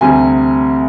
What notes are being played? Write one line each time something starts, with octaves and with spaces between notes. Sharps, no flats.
D2 C3 G3 G#5